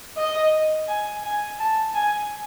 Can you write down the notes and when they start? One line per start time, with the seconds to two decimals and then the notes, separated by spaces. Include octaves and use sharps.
0.17 D#5
0.88 G#5
1.23 G#5
1.59 A5
1.94 G#5